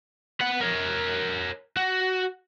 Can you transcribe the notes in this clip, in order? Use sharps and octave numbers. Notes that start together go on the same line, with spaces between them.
B4 F#5
A#4 C#5
F#4